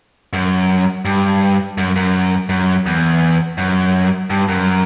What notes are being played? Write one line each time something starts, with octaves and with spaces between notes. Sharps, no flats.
F#2
G2
F#2
F#2
F#2
E2
F#2
G2
F#2